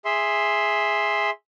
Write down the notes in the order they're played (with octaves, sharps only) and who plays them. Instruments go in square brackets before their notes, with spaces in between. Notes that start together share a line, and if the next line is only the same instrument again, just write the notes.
[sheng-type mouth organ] G#4 E5 C6